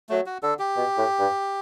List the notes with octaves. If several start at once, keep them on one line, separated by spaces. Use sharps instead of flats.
F#3 A3
F#4
D3 A4
G4
B2
A2
G2